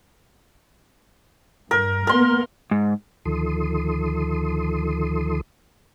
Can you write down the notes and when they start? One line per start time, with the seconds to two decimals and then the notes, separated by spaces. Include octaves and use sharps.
1.71 G2 A#4
2.07 A#3 B3 A#4 C6
2.71 G#2
3.25 D2 D#3 F3 A4 C6 D#6